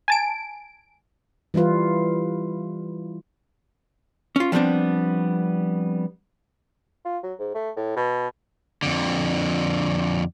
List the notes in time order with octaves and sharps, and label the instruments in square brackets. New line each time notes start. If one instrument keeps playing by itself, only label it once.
[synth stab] G#5 A5 D7
[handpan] E3 G3 E4 F4 B4
[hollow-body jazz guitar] C#4 F4
F3 G3 G#3 B3 C4 D4
[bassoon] F4
F#3
G#2
A3
A2
B2
[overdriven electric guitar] F2 D3